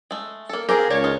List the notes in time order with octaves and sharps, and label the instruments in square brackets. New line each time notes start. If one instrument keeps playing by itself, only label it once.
[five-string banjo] G#3 A3
A#3 A4
[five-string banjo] C4 G4 [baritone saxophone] G#4 [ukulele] A#4 F5
[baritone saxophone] C#2 [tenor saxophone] C#5 [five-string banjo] D5
[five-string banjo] D#4 F4